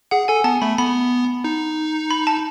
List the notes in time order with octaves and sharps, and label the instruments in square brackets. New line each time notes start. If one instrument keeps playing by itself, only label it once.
[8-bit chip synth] G#4 [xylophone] F#5
[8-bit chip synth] A4 [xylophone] G#5
[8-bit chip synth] B3 [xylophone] A5
[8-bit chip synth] A3 [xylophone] B5
[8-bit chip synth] B3 [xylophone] B5
[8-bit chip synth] D#4
[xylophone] B5
A5